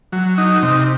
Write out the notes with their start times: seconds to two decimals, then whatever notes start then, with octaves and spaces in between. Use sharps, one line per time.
0.12 F#3
0.38 D#4
0.63 C3